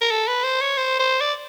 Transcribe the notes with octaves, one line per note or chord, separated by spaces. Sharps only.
A#4
A4
B4
C5
C#5
C5
C5
D5